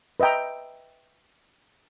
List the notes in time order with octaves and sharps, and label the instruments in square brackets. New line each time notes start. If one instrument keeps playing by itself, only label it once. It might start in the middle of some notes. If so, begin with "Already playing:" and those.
[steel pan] B4 D#5 E5 G5 A#5